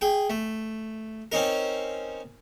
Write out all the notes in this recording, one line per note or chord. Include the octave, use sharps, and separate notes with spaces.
G#4 G5
A3
C4 C#4 D#4 A#4